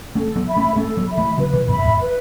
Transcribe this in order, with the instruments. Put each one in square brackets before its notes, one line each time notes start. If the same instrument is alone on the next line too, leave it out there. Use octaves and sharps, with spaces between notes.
[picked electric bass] A3 C#4 [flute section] A4
[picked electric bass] F#3 B3
[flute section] E5 B5
[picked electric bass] A3 C#4
[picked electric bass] A3 C#4 [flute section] A4
[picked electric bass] F#3 B3
[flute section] E5 B5
[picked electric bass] E3 A3
[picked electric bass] C#3 F#3 [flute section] B4
[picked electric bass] B2 E3
[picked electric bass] F#2 B2 [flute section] E5 B5
[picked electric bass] E2 A2
[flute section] B4